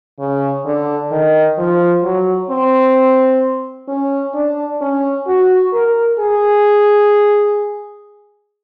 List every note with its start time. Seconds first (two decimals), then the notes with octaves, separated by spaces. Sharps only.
0.19 C#3
0.65 D3
1.11 D#3
1.58 F3
2.03 F#3
2.50 C4
3.88 C#4
4.34 D4
4.81 C#4
5.27 F#4
5.73 A#4
6.19 G#4